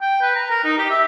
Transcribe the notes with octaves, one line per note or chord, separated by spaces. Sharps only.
G5
B4
A#5
A#4
D#4
G4
E5